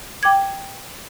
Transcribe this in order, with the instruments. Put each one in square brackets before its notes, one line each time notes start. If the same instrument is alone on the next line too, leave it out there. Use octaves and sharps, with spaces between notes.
[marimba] G5 D6 G#6